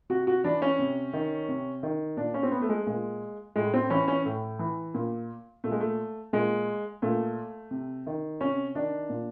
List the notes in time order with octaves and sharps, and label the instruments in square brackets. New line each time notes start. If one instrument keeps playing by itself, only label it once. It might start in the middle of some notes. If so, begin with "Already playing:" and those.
[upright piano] C3 F#4
F#4
E3 D4
C#4
C3
D#3
C3
D#3
A#2 D4
C#4
C4
B3
A3
G#3
A#2 G#3
A2 G#3
C4
E3 C#4
C#4
A2
E3
A#2
A#2 A3
G#3
A3
A#2 G#3
A#2 A3
C3
D#3
C3 C#4
D#3 D4
A#2